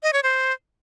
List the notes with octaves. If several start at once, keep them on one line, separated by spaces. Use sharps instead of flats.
D#5
C#5
C5